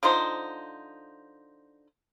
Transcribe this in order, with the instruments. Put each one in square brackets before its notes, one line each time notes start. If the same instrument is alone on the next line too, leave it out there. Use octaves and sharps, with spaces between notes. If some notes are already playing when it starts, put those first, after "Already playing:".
[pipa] D3 F3 D#4 C5